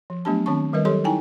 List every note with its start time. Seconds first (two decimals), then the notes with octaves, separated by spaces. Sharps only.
0.10 F3
0.25 F#3 A3 B3 D4 G4 A5
0.46 D#3 C4 D4 A5 C#6
0.73 D#3 G3 A#4 B4 D#5
0.85 F#3 G4 A4 C#5 C6
1.04 D#4 E4 G5 G#5 A#5